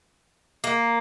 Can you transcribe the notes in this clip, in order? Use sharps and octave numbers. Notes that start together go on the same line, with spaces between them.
A#3